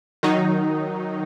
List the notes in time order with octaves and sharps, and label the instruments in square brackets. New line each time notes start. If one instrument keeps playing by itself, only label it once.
[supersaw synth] D#3 F#3 D#4